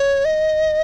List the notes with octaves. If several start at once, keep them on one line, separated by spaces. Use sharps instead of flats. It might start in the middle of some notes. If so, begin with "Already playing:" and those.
Already playing: C#5
D#5